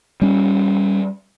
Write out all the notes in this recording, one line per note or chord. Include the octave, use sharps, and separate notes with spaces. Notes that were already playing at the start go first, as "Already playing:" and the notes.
G3 C#4